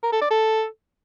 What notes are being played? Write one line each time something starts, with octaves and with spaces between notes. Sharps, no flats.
A#4
A4
D5
A4